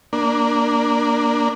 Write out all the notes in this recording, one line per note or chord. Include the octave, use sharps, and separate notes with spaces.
A#3 D4